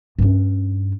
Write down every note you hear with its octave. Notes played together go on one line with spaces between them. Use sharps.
G2 C#4